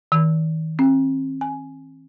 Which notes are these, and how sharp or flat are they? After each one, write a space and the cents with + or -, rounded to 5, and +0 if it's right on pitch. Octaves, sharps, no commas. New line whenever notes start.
D#3 +40
C4 +40
G#5 +10